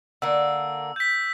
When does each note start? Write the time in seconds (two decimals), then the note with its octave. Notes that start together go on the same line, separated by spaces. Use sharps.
0.22 D3 A#3 E6
0.96 G6 B6